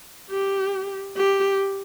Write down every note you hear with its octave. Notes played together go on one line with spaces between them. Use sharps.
G4
G4